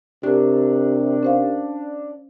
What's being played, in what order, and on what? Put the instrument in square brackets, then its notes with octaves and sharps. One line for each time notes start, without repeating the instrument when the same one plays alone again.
[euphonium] C3 [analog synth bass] D4 [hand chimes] G4 A#4
[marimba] C#4 C5 F5